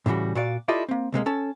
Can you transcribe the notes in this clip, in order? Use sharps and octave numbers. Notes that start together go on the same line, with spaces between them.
A2 C#3 E3 G3 F#4
A#2 F#4 D5 F5
E4 F4 G4 A4 D5 D#5
A#3 C4
C#2 C3 G#3 A#3
C#4 A4 A5